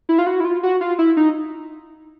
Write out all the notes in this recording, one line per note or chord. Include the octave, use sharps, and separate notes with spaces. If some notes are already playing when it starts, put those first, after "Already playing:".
E4
F4
F#4
E4
F4
F#4
F4
E4
D#4